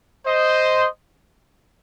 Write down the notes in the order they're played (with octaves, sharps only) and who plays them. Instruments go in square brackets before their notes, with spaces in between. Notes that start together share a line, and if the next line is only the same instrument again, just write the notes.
[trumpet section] C5 D#5